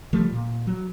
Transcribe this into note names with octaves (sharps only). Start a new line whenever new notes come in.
C#3 F3 G3 A3
A#2
F#3